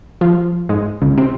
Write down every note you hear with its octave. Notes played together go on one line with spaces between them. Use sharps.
F3 F4
G#2 G#3
C#2 C#3
C3 C4